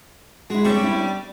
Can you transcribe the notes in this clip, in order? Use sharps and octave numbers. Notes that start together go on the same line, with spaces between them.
G#3 E4 F#4
G3 B3 C4 D4 C#5 E5 C#6
C4 C#4 E4
D5